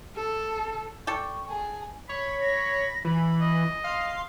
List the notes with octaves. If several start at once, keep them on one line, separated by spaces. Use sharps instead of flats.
A4
A4 D5 G5 C#6
G#4 A5
C#5 B5
A#6
E3 B5
D#5
F5 C6